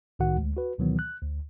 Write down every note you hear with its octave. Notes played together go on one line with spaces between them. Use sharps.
C2 A2 D#3 F#4 F#5
D2 G#3
F#4 B4
D2 B2 D#3 E3 F#3 B3
F#6
D2